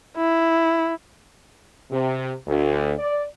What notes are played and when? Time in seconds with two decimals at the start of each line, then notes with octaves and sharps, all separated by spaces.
0.17 E4
1.91 C3
2.47 D2
2.98 D5